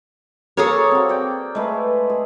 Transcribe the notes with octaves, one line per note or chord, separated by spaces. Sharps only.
A#3 G#4 A4 C#5
C4 F#4
D5 G5
G#3 A3 B4
G#4